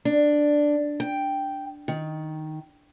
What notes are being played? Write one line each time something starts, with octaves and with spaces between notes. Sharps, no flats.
D4
G5
D#3